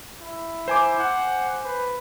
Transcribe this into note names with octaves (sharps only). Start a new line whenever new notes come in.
E4
C5 G#5 D6
F#5
B4